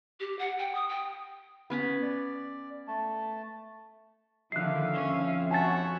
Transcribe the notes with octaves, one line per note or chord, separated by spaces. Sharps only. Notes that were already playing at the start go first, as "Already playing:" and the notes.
G4
F#5
G5
D#6
G5
B3 C#4 B5
D5
A3 A5
D3 D#3 F3 E5 F5 F#6 C7
F2 C#4
F#4 C#5 E5 F#5 G#5 A5 A6